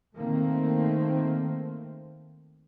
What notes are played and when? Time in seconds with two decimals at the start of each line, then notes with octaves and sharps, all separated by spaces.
0.14 D#3 A3 A#3 C4